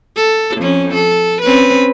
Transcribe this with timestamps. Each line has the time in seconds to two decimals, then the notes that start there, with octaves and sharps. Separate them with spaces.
0.16 A4
0.57 F2 C#4
0.94 A4
1.42 C4 C#4 B4